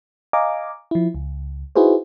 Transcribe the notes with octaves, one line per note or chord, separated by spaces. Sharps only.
D#5 F5 G#5 A#5 D6
F3 E4
C#2
D#4 E4 F#4 G#4 B4 C5